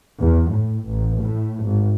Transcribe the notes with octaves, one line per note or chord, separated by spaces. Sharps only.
E2
A2
A1
A2
G#1